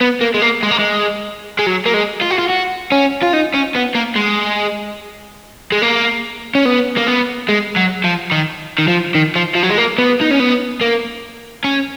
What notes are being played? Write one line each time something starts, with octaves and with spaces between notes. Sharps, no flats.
B3
A#3
G#3
A#3
G#3
A#3
G#3
G#3
F#3
A#3
G#3
F4
F#4
F4
F#4
C#4
F4
D#4
C#4
B3
A#3
G#3
G#3
A#3
C#4
B3
A#3
B3
G#3
F#3
F3
D#3
D#3
F3
D#3
F3
F3
F#3
G#3
A#3
B3
D#4
C#4
B3
A#3
C#4